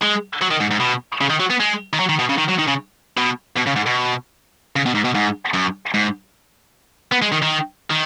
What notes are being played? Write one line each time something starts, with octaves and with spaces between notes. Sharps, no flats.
G#3
F#3
D#3
G#2
G#2
B2
C#3
D#3
F#3
B3
G#3
D#3
F#3
D#3
B2
C#3
D#3
F#3
D#3
C#3
B2
B2
C#3
G#2
B2
C#3
B2
G#2
B2
G#2
F#2
G#2
B3
G#3
D#3
D#3
D#3